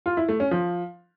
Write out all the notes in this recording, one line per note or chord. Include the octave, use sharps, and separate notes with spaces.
F4
E4
A3
C#4
F3